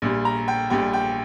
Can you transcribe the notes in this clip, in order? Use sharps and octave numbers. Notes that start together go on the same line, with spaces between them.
A#1 A#2 G3
A#5
G5
A#1 A#2 G3 G5
G5